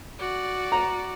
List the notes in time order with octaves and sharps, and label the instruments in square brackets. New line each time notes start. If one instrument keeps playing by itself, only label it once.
[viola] F#4 D5
[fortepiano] A#5